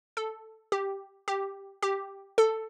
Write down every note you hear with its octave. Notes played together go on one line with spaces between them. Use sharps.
A4
G4
G4
G4
A4